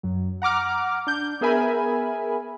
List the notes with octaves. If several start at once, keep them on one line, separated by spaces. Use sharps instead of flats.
F#2 F#3
F#5 A#5 D6 F6
D4 G6
B3 G#4 A#4 E5 G#5 B5